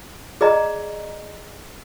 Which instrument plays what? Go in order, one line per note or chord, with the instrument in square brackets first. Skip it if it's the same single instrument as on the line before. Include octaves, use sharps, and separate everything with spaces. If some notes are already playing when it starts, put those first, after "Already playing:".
[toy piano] G#4 D5 D#5 A#5